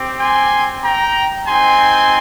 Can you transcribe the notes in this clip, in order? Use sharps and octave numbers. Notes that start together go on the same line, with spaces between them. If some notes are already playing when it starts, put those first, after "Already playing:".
Already playing: C4 G4
G#5 C6
G5 A#5
C4 D#4 G4 G#5 C6